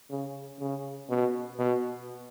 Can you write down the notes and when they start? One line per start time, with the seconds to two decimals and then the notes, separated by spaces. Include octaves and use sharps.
0.10 C#3
0.60 C#3
1.10 B2
1.59 B2